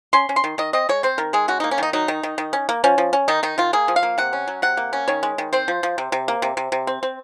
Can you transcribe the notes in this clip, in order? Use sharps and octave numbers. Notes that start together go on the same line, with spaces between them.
C#4 C6
C#4
C6
D#3
D#3 D#5
C4 D#5
G#3 C#5
C4 C5
D#3 A#4
G#3 G#4
C#4 F#4
A#3 D#4
C#4
D#3 D#4
F#3 D#4
D#3
D#3
D#3
C#4
A#3
F3 C#4
F3
C#4
D#3 D#4
D#3 D#4
D#3 F4
A#3 G#4
F3
F5
A#3
C3 F#5
C#4
F#3
C3 F#5
A#3
C#4
D#3 C#5
G#3
D#3
C4 C5
F3
F3
C3
C3
A#3
C3
C3
C3
C4
C4